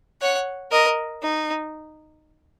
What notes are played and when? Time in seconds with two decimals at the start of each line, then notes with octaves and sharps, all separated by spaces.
0.21 C#5 F#5
0.71 A#4 D#5
1.21 D#4